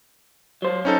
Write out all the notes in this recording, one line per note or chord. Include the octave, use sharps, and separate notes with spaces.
F#3 C5
C#4 D#4 A4